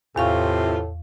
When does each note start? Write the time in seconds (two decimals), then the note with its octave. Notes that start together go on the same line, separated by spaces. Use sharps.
0.16 E2 A2 C3 E3 F4 A4 F5 C#6